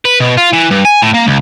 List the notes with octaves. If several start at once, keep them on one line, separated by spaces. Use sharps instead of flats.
B4
B2
F4
E3
G2
G#5
A2
A#3
C#2